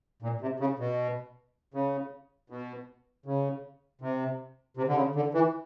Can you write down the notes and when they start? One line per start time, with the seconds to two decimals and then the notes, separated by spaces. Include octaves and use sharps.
0.22 A#2
0.41 C3
0.60 C#3
0.79 B2
1.74 C#3
2.50 B2
3.26 C#3
4.01 C3
4.77 C3
4.88 D3
4.96 C#3
5.15 D3
5.34 E3